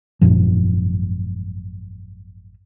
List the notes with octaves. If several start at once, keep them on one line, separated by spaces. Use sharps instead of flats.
G#1 F#2 A#2 F3